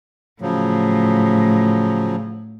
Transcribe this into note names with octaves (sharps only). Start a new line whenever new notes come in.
A2 C#3 F3 F#3